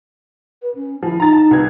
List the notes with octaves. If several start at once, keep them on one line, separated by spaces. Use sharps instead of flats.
B4
C#4
E3 F3 E4
D#4 A#5 A6
A5
C2 B4 G#6